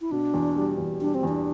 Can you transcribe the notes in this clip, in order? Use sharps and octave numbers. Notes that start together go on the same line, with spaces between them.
E4
B2 D4
E2
G3
E2
G3 D4
C4
E2
D4